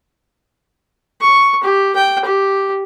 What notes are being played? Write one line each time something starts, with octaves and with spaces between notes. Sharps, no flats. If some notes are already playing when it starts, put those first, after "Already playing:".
C#6
G4
G5
G4